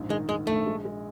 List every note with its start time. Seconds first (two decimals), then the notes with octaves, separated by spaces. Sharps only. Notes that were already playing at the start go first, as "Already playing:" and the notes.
Already playing: A#1 G#2
0.10 D#3 G#3
0.29 G#2 G#3
0.47 A#1 A3
0.66 G#3
0.85 G#3